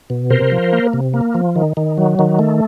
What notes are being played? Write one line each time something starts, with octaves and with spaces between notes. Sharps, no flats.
B2
C3 A#4 C5
F3
A#3
C3
A#3
F3
D#3
D#3
F#3
D#3
A3